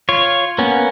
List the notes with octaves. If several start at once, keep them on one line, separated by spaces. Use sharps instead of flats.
F4 C#5
A#3 B3 C#4